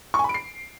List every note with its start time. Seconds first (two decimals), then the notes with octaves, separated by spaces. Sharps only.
0.14 C#6
0.19 G#5
0.24 B5
0.29 D7
0.34 C7